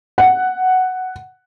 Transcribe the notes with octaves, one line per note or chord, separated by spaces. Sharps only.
F#5